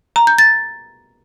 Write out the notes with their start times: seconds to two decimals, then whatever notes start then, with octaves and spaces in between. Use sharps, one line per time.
0.16 A#5
0.27 G6
0.38 A6